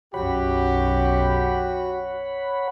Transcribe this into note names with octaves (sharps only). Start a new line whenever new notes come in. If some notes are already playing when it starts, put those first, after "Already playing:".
B1 F#2 F#4 G4 C#5 F#5 B5